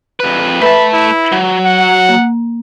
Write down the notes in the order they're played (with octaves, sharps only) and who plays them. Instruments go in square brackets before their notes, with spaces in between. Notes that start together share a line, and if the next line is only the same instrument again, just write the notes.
[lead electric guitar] F2 B4
[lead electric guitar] A3 A5 [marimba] B4 E5 [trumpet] B5
[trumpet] E4
[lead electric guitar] F#3
[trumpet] F#5
[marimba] A#3